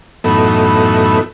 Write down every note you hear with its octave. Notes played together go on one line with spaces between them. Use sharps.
F#2 A2 E3 A3 B3 D#4